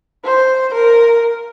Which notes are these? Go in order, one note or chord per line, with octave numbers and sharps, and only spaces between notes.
C5
A#4